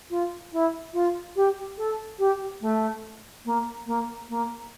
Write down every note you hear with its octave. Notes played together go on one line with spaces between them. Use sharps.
F4
E4
F4
G4
A4
G4
A3
A#3
A#3
A#3